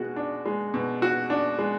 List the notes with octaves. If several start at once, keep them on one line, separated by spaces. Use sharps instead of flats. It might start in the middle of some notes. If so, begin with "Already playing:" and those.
Already playing: B2 G#3 F#4
D4
G#3
B2
F#4
D4
G#3